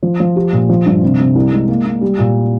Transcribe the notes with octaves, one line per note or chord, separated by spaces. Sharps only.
F3
F3
G4
A#2
F3
G2
C3
C3
C2
G#3
A#3
A#3
G3
A#2